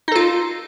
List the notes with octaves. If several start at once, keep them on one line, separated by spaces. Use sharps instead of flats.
D#4 F4 A4